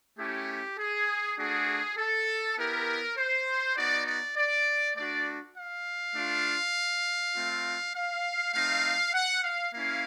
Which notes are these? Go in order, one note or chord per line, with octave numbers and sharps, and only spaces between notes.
A3 C#4 E4 G4
G#4
A3 D4 F#4 G#4
A4
B3 E4 G4 A#4
C5
B3 D#4 F#4 D5
D5
D5
A3 D4 F#4 D5
F5
A3 D4 F4
A3 C4 F4
F5
A3 C4 D#4 F5
F#5
F5
A#3 C#4 E4 F5